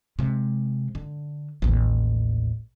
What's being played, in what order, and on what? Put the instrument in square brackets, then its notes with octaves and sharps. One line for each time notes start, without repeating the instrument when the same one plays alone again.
[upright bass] C3 G#3
D3
A1 D#2